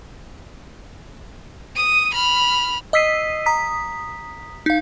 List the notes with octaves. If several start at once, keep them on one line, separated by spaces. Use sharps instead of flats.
D#6 D#7
B5 F6
D#5 D#6 E6 B6 C7 D#7
A#5 D#6 B6
D#4 F5